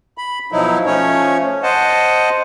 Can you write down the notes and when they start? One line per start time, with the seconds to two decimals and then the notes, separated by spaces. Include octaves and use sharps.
0.18 B5
0.52 B2 F3 F#3 D#4 E4
0.86 F3 A3 C#4 C#5
1.63 C5 D#5 F#5 A5